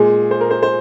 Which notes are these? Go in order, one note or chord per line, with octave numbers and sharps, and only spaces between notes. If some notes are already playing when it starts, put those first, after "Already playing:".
Already playing: A#2 G#3 G#4
C5
A#4
C5
C5